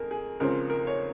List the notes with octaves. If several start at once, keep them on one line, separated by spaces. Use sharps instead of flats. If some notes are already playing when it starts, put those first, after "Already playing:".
Already playing: F2 G#4 A#4
G#4
C#2 C#3 F3 C4 A#4
A#4
C#5